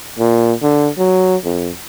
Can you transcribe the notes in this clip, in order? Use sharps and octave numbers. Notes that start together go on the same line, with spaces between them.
A#2
D3
F#3
F2